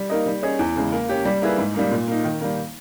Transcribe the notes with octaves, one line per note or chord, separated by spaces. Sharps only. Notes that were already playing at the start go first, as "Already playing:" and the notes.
Already playing: G3
A#3 D#4 A#4 D#5
G3
C#4 G#4 D#5
E2
C#3 G#3
A#3
C#4 G4
G3
A#3 E4 G#4 B4
G#2
G3 A#3 D#4
A#2
A#3 D#4
D#3
G3 A#3